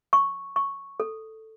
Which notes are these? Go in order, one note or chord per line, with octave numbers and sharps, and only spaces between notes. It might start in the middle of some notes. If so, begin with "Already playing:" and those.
C#6
C#6
A4